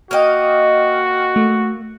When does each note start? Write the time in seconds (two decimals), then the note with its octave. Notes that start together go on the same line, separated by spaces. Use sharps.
0.11 A#3 F#4 D#5 G5 F6
1.36 A3